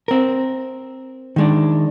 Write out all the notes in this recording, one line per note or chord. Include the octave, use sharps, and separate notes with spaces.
C4 A#4
D#3 G#3 D4